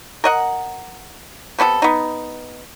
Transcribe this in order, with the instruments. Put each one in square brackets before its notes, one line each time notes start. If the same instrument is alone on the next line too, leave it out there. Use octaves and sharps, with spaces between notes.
[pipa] A#4 D#5 F#5
C3 B3 C#4 A4
B3 D#4